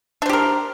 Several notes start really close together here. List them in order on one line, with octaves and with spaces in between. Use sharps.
D4 C5 G4 A#4